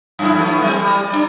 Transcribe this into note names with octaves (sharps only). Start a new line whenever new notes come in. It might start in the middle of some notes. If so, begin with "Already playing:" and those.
F#2 A3 E4
F#3 A3 B3
G3 C4
G3
D4 D5